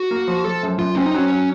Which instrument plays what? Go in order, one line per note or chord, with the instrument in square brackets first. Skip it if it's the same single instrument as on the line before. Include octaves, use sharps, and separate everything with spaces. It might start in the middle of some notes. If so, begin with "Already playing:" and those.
Already playing: [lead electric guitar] F#4
[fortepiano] A#3
F3
[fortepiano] F3 [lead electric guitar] A4
[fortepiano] F#2
[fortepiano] F#2 [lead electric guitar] F4
[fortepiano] C4 [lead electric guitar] C#4
[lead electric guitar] D#4
[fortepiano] F#3 [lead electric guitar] C#4
[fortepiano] F#3